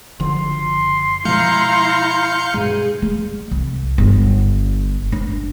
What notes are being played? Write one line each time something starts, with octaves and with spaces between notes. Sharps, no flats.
F#1 D3 F3 C6
B2 F3 G#3 E4 F5 A#5 G6 C#7
G2 B2 G#3 G#4
G3
C2
G1 D3
D4